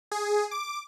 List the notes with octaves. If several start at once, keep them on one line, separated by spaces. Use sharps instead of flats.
G#4
D6